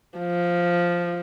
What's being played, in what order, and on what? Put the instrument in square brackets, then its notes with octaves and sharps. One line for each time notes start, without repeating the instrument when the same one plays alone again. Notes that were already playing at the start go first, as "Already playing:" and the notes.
[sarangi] F3